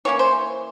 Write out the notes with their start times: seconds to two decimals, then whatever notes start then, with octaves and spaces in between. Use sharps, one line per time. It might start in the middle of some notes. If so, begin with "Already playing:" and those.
0.05 E3 A#3 C#4 C#5
0.19 C5